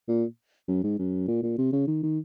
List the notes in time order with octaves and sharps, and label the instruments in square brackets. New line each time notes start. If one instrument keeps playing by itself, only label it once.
[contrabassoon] A#2
F#2
G#2
F#2
A#2
A#2
C3
C#3
D#3
D#3